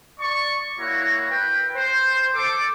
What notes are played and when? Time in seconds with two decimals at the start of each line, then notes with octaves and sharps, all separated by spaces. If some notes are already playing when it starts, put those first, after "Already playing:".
0.20 D5 C#6
0.79 A#3 E4 F#4 C#5 A#5
1.30 B4 G5
1.76 C5
2.34 A4 D6